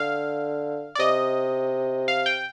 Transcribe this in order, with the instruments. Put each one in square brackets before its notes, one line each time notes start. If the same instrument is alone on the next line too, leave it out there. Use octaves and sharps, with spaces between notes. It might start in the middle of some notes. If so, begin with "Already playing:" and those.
Already playing: [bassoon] D3 [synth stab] F5
[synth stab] D5
[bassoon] C3 [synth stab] D#5
[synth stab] F5
G5